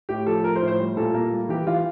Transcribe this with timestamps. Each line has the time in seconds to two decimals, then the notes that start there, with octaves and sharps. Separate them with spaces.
0.09 A2 G4
0.27 F3 A4
0.44 F3 A#4
0.56 C5
0.62 A2
0.68 C5
0.80 G3
0.97 A#2 A4
1.14 A#3
1.33 G3
1.49 E3 G4
1.67 E3 F4